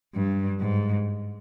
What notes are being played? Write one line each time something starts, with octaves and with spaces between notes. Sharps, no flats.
G2
G#2